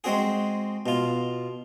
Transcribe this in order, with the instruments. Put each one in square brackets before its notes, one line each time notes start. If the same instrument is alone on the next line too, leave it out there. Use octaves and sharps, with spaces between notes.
[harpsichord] G#3 C4 F#4 G#4
B2 F4